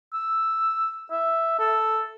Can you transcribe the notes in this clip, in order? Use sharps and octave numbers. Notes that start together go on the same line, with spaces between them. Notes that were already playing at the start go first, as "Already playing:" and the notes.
E6
E5
A4